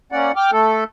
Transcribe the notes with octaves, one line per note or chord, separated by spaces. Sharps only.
A#3 C#4 D5 F#5
G5 D6 F6
A3 A4